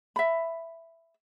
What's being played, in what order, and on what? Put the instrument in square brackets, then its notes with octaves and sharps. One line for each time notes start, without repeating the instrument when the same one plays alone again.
[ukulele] E5 B5